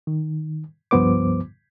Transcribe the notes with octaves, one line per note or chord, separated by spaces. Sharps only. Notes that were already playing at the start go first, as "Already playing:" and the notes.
D#3
C#2 G2 F3 B3 C5 D6